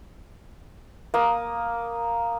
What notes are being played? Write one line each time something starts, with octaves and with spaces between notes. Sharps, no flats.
A#3 D#6